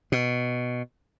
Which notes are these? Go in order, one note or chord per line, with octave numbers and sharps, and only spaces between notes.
B2